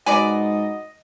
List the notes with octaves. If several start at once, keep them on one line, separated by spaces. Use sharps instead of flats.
G#2 F#3 B4 D5 D#5 G#5